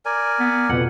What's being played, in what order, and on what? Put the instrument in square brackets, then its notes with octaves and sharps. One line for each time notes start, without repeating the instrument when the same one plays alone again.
[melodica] A#4 D5 G#5
[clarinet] B3
[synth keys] F2 B2 [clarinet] F#5